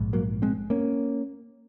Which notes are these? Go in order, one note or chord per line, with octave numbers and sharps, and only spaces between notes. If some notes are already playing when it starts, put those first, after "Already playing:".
Already playing: A#1 G#2
F#3 A#3
G#3 C4
A#3 C#4